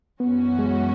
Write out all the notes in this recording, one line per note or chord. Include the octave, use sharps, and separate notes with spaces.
F#2 E3 B3 C#4 F#4
G#3